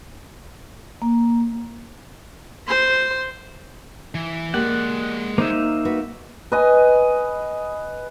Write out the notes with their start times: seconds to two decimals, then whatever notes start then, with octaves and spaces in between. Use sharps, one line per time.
1.02 A#3
2.68 C5 C6
4.15 E3
4.54 G#3 A#3 G4 D5 F#5
5.38 A#3 D#4 C5 E5
5.85 F#4 B4
6.52 B4 D#5 G#5